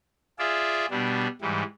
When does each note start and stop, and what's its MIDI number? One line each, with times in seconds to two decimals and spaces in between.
0.39 0.86 65
0.39 0.86 68
0.39 0.86 74
0.39 0.86 76
0.90 1.27 47
0.90 1.27 55
0.90 1.27 62
1.41 1.63 44
1.41 1.63 52
1.41 1.63 55